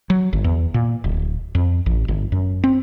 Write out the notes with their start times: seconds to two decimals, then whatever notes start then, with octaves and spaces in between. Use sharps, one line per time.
0.10 F#3
0.33 G1
0.44 E2
0.74 A#2
1.04 D1
1.55 F2
1.86 A1
2.08 G1
2.32 F#2
2.64 C4